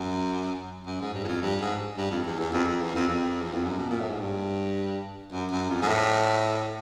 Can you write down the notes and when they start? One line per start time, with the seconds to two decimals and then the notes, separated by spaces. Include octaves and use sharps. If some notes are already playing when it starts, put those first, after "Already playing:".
Already playing: F#2
0.86 F#2
1.01 G#2
1.14 G2
1.24 E2
1.28 F2
1.43 G2
1.61 G#2
1.97 G2
2.11 F2
2.26 E2
2.40 E2
2.53 F2
2.68 F2
2.81 E2
2.96 F2
3.09 F2
3.41 E2
3.54 F2
3.65 F#2
3.78 B2
3.90 A#2
4.00 A2
4.10 G#2
4.20 G2
5.32 F#2
5.52 F#2
5.70 F2
5.82 G#2
5.88 A2